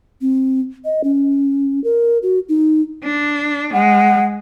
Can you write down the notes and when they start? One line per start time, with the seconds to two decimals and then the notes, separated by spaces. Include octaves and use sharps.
0.21 C4
0.85 D#5
1.04 C#4
1.84 A#4
2.23 F#4
2.49 D#4
3.04 D4
3.74 G#3 F#5